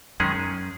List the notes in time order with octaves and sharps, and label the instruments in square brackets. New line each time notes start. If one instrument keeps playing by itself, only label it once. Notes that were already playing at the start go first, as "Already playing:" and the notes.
[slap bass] F#2 [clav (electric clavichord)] D#3 G#3 C#4 G#4